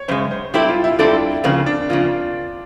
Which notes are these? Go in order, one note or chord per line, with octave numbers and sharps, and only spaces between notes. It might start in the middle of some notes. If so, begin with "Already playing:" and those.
Already playing: C#5
F#2 C#3 G#3 C5
C5
G3 C4 E4 G4 A4 C5
F4
E4
G3 C4 D4 E4 A4 C5
C#3 F3 A#3 C4
D4
C#3 F3 A#3 F4